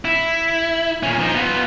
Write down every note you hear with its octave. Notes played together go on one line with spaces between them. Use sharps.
E4
A#2 C#4
F3 D#4
B3 F4